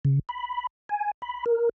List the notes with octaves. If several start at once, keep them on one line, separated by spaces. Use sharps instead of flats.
C#3
B5
G#5
B5
A#4